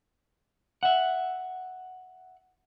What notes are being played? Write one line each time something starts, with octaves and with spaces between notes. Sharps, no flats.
E5 F#5